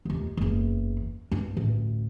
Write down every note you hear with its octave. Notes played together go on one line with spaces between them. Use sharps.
F1 D#2
F#1 E2
G2 D4
A1 D2